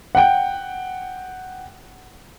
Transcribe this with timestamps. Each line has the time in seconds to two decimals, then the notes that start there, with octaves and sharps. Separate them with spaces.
0.15 F#5 G5